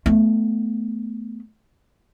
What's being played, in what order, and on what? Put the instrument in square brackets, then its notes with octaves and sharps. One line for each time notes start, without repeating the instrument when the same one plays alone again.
[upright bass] A3 B3